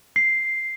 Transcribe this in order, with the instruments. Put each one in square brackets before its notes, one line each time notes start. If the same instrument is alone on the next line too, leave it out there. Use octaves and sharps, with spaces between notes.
[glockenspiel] C7